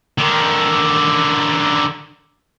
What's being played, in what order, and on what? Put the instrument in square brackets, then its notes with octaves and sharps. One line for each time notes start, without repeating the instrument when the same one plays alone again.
[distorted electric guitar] D3 D#3